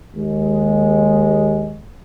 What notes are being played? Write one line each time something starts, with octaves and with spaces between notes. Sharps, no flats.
D#2 G#3